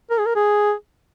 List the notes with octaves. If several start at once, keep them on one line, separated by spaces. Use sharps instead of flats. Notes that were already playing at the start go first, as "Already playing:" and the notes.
A#4
G#4
A#4
G#4